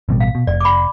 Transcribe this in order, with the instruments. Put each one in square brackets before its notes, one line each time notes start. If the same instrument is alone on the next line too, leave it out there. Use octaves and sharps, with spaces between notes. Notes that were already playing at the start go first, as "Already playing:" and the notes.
[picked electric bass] A1 B2 G3
[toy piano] F5
[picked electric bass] B2
[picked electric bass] F1 [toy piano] D5
[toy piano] B5 D6